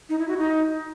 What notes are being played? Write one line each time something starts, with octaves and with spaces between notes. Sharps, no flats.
D#4
E4
F#4
D#4